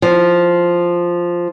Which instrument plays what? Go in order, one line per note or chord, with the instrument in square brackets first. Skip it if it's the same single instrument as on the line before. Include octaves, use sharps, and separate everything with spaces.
[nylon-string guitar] F3